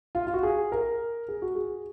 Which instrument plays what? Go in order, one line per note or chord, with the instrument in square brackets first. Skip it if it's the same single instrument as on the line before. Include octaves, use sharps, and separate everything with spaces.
[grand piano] F4
F4
F#4
G#4
A#4
G#4
F#4
G#4